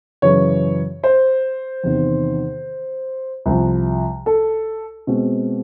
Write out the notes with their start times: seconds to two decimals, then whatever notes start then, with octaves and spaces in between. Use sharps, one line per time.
0.22 F#2 C#3 E3 C#5
1.03 C5
1.84 E2 C3 D#3
3.46 C2 C3 F3
4.26 A4
5.07 B2 G#3 C4